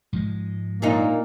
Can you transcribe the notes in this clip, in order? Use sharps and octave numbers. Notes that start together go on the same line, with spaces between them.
G#2 F3 G#3
A#2 A#3 D4 D#4